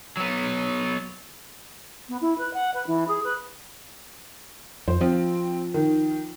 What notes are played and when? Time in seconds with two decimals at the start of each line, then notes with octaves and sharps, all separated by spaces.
0.17 F#3 B3
2.08 B3
2.21 E4
2.38 B4
2.53 F#5
2.74 B4
2.87 E3
3.08 G#4
3.23 B4
4.88 F2 C5
5.01 F3 C4
5.74 D#3